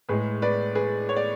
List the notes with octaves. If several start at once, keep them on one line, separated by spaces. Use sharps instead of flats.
A2 G#3 G#4 B4
B4 D5
G#4 B4
C#5
D5